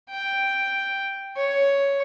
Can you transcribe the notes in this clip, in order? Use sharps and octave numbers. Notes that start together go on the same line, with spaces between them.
G5
C#5